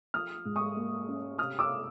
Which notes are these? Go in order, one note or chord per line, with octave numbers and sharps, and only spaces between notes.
F3 D#6 F6
G#2
C#6 D#6
A#3
C#4
C3 D#6 F6
D6 E6